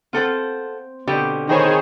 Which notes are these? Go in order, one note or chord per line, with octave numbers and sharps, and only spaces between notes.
C4 F4 A4 C5 F#5
B2 D3 C4 F4 G4 G5
D#3 G#4 C5 C#5 G5 A#5 B5